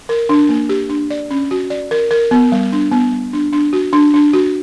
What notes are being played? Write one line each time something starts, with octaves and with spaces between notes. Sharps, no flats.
A#4
D4
A#3
G4
D4
D5
C#4
F#4
D5
A#4
A#4
B3
G3
D4
B3
G3
D4
D4
F#4
D4
D4
F#4